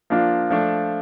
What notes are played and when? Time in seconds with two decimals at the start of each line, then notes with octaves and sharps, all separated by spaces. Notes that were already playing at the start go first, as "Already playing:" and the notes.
0.10 F3 A#3 D4 F4
0.50 F3 A3 D4